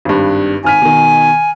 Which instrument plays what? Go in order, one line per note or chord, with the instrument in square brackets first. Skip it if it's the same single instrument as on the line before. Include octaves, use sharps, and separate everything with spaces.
[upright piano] G#1 G2
[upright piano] G#1 F6 B6 [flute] G#5
[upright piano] B2 D#3